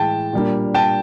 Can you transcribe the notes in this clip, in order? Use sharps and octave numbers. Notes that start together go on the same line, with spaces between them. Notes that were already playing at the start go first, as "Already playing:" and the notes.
Already playing: A2 E3 G#3 G5 A5
A#2 G3 A#3 D4
G5 A5